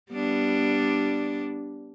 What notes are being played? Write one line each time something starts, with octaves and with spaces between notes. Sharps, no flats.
G3 B3 D4